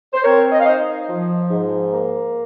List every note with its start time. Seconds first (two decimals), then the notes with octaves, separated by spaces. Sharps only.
0.13 C5
0.24 C4 A#4 C#5
0.52 D#5
0.60 F5
0.66 D#4 C5 D#5
1.08 F3
1.50 G#2
1.92 A#3